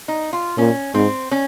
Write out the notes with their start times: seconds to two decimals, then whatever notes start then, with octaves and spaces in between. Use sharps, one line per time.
0.08 D#4
0.33 F4
0.58 A#2 C#4
0.94 G#2 C4
1.31 C#4